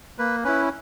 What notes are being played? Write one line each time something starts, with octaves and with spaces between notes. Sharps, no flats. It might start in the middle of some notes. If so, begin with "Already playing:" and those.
A#3 B4
C#4 E4 B4